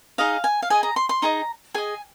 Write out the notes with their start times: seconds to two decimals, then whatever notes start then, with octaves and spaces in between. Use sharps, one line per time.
0.18 D#4 G#4 D#5 F5
0.44 G#5
0.62 F5
0.70 G#4 D#5 G#5
0.83 A#5
0.96 C6
1.09 C6
1.22 D#4 G#4 D#5 A#5
1.74 G#4 D#5 G#5